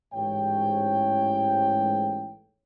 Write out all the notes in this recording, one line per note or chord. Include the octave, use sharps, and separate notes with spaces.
A1 G#2 C#5 G5